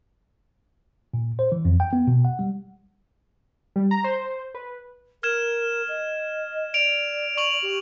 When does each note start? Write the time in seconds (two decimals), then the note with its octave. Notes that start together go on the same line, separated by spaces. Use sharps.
1.14 A#2
1.39 C5
1.52 E3
1.65 F2
1.80 G5
1.93 B3
2.07 B2
2.25 F#5
2.39 G3
3.76 G3
3.91 A#5
4.04 C5
4.55 B4
5.23 A#4 F6 G#6 E7
5.89 D#5
6.74 D5 D7 F7
7.37 C#6 F7 F#7
7.62 G4